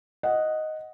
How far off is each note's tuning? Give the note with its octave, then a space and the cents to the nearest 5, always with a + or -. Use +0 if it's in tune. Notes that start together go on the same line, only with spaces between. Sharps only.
D#5 +0 F#5 +0